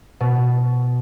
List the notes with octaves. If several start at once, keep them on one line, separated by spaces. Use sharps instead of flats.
B2